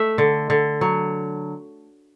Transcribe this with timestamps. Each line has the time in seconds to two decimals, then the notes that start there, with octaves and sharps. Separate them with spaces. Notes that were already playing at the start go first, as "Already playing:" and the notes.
Already playing: A3 E5
0.18 D3
0.50 D3
0.81 F#3